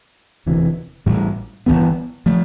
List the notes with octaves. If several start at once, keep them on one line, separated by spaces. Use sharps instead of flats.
E1 D2 C3 E3
A1 A2 G3
G1 F2 E3 B3
F3 A3